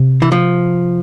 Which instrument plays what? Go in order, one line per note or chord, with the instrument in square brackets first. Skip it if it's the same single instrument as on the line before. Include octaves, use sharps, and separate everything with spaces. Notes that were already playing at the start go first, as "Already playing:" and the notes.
Already playing: [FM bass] C3
[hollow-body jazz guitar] E3
F3